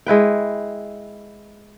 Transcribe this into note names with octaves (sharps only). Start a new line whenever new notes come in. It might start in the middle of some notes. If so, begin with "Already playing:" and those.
G#3 E4 B4 G5